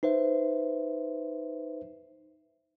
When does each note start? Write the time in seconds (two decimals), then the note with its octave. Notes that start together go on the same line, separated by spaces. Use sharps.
0.03 D#4 B4 C5 E5